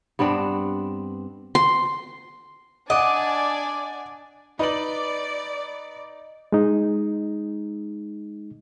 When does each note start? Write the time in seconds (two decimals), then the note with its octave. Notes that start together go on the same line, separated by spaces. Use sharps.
0.19 G2 B3 C4 D4
1.55 C6
2.90 D4 D5 D#5 F#5 G#5 D6
4.59 D#4 B4 D5 F#7
6.52 G#3 D#4